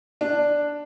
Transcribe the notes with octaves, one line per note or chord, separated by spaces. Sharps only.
D4